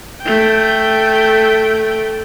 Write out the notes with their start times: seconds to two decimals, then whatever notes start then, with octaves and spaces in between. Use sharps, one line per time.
0.22 A3 G5